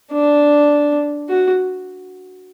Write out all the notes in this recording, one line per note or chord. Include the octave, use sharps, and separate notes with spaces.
D4
F#4